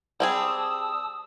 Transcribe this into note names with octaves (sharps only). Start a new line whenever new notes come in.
G3 C4 G#4 A5 D#6 E6